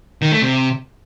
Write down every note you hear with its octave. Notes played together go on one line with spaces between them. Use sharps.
D#3
A3
C3